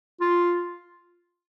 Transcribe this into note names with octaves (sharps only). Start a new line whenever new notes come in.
F4